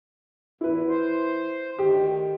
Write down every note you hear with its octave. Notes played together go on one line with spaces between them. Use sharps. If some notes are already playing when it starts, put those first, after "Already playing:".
E2 E4 B4
C5
D2 D#3 G4